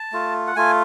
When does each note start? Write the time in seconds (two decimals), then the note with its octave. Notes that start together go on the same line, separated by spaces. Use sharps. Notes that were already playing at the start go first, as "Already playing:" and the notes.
Already playing: A5
0.12 A3 F4
0.47 F#5
0.56 A3 F4 G#5